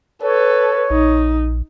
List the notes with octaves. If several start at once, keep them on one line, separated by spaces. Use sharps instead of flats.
A4 B4 C#5
A#1 D#4